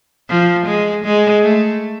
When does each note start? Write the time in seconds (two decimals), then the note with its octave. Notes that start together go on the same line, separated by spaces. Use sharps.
0.29 F3
0.66 G#3
1.05 G#3
1.43 A3